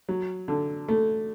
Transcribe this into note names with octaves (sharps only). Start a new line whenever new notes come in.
F#3
D3
A3